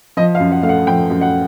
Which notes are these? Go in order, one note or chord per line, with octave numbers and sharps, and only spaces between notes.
F3 D#5
F5
F#2
F#5
A3 F5
F#5
F3 G5
F#2
F#5